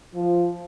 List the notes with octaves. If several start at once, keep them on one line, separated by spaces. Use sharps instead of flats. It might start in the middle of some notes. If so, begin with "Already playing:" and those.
F3